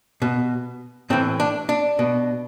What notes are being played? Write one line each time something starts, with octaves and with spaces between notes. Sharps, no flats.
B2
A2 E3 C4
D4
D4
B2